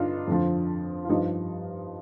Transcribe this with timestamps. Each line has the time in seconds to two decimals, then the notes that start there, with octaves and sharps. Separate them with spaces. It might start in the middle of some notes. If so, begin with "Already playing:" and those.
Already playing: G2 D3 D4 D#4 F4
0.28 F2 D3 F3
1.05 F4
1.09 G2 F3 D#4 G4